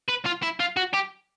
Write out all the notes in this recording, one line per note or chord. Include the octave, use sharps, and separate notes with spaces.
B4
F4
E4
F4
F#4
G4